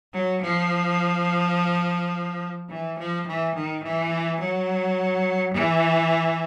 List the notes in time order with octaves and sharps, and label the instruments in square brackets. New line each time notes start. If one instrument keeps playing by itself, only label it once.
[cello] F#3
F3
E3
F3
E3
D#3
E3
F#3
E3